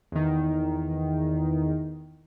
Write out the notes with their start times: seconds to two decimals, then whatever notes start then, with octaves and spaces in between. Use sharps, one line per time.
0.12 E2 D#3